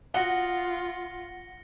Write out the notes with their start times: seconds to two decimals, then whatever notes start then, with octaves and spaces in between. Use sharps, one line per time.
0.14 F4 F#4 F#5 D#6 A#6 C#7 G7